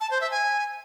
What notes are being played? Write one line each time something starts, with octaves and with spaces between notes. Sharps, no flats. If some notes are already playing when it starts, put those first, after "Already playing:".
A5
C5
E5
G#5